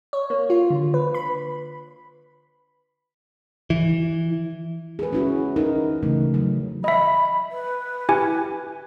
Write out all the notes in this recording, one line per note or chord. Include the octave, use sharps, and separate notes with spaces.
C#5
A#3
F4
D3
B4
B5
E3
G#4 B4
C#4 E4 F#4
D#4 A#4
C#3 E3 A3
F#3
D#5 E5 B5
B4
E4 G4 G#5